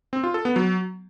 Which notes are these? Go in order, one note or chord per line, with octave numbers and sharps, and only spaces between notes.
C4
F4
A4
B3
F#3